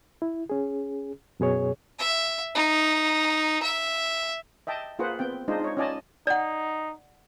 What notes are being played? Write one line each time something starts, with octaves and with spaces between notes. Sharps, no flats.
E4
C#4 G#4
F#2 B2 G#4 C#5
E5
D#4
E5
D#5 E5 G5 A5
A#3 F4 G#4 B4 C5 F#5
B3 C4 G5
G#3 D4 D#4 F4 C5 D#5
D#4 C#5
C#4 F4 D5 D#5 G#5 A5
D#4 D5 F#5